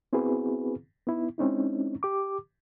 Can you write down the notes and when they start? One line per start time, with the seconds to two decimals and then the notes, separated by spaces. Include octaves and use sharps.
0.13 B3 C4 E4 F#4 G#4 B4
1.07 B3 D#4 E4
1.38 G#3 C4 C#4 D#4 E4
2.03 G4 D6